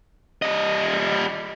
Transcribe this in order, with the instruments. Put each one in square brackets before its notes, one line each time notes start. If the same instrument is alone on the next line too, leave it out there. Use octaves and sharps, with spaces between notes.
[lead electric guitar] G3 D#5